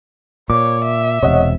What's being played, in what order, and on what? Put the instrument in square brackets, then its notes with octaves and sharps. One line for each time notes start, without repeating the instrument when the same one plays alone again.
[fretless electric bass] A#2 [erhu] C#5 [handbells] D6
[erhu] E5
[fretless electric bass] E1 C3 [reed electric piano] C#5 D#5 F#5